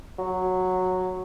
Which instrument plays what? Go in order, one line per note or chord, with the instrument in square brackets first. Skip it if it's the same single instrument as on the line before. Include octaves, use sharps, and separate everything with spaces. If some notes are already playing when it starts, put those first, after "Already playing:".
[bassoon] F#3